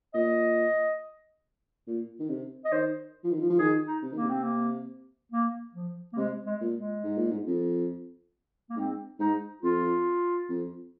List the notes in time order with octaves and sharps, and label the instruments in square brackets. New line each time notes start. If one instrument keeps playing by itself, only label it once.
[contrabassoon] A#2 [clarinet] D#5
[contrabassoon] A#2
D#3
C3
[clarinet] D#5
[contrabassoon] D#3 [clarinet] C5
[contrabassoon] F3
D#3
F3
F3
[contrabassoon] D#3 [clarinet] G#4
[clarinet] D#4
[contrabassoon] C3
[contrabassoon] D#3 [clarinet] A#3
[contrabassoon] C3
[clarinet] C4
A#3
A#3
F3
A#3
[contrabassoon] C3 [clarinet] G#3
[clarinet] G#3
[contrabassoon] A#2
[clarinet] G#3
[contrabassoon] G#2
A#2
G#2
F2
[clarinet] A#3
[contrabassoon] G#2 [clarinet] C4
[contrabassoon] G#2 [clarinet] D#4
[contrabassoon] F2 [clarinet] F4
[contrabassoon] F2